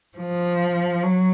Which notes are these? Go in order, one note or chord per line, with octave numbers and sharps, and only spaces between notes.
F3
F#3